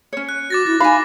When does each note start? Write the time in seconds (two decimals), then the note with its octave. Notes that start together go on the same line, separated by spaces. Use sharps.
0.13 C#4 C#5
0.29 F#6
0.50 F#4 D6 A6 A#6
0.66 E4 A6
0.80 D#4 F5 G#5 B5